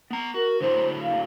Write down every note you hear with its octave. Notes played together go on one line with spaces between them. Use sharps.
B3 A#5
F#4 A#4
D3 F#3 E4 C5
F5